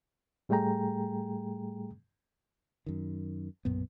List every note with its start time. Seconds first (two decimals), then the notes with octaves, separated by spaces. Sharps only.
0.49 A2 G3 A3 G#4 G5 A#5
2.86 F#2 D#3
3.65 B1 F#2 A#2 B3